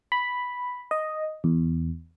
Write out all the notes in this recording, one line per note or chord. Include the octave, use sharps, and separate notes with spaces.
B5
D#5
E2